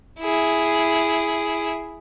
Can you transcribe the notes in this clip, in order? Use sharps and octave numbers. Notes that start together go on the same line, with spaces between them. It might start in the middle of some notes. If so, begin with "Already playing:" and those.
E4 G#4